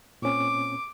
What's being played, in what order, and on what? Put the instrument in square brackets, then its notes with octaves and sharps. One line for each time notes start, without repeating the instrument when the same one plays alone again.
[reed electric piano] A#2 C4 C#4 [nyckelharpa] D6